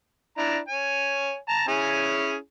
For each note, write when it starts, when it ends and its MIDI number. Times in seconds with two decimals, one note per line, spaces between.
0.38 0.58 62
0.38 0.58 64
0.38 0.58 82
0.68 1.36 73
0.68 1.36 80
1.49 1.67 81
1.49 1.67 82
1.68 2.36 61
1.68 2.36 64
1.68 2.36 68